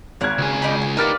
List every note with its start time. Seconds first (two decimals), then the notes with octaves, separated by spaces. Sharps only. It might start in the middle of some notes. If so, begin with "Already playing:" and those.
0.21 G#1 A#4 F#6 G#6
0.38 C#2 G#4
0.62 D4 D#4 B5
0.82 G#5
0.97 D#4 G4 A#4 B4 D5 F5 F6 A6